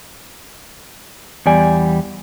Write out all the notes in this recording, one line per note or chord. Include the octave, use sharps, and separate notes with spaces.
E2 G3 D5 G#5